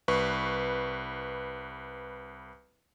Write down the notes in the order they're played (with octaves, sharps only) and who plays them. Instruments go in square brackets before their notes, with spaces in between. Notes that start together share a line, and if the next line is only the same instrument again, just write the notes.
[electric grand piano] C2 B4 C#6